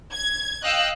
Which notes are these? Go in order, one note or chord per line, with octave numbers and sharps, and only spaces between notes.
G#6
D#5 F5 G5 E6 F#6